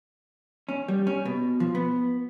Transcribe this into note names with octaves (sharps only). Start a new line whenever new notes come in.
C#4
G3
C#4
B2
F3
B3